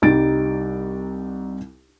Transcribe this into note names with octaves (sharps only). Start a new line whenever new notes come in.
C2 G3 D#4 A6 D7